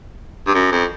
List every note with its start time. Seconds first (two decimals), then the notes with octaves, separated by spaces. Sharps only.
0.46 G2
0.54 F#2
0.72 F2